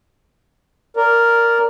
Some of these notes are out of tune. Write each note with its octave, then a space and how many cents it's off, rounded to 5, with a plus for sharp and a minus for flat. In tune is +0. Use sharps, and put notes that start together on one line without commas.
A#4 +0 D5 -20